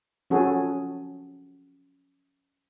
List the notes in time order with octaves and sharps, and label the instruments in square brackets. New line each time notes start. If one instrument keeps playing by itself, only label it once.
[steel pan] F3 C#4 F#4 G#4 A4